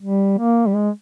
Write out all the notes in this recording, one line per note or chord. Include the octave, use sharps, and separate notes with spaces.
G3
A#3
G3
G#3